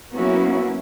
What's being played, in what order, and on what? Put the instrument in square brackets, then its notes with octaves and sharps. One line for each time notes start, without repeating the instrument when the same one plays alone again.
[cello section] F#3 A#3 B3 C#4 E4 F#4